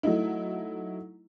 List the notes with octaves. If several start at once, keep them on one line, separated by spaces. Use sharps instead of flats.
F#3 A3 D#4 E4